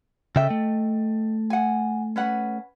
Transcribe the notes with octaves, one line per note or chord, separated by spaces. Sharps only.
C#3 A4 D#5 E5 G5
A3
F#5 G#5
C#4 B4 F#5